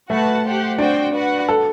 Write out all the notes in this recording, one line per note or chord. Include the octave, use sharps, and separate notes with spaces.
A3 F#4 B4 F#5 A5
G4 C5 F#5
C4 D4 F#4 C5 G5
F#4 B4 D5 F#5
A4